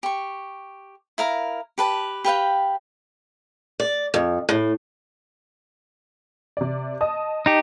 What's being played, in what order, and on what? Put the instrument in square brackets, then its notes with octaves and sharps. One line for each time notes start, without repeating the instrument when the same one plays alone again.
[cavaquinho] G4 C#6
E4 A#4 F5 A#5
G4 B4 A5
G4 B4 F5 G5
[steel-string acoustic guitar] D5
F2
A2
[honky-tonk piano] C3 D5
D#5 A5 D#6
[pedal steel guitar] D#4 G4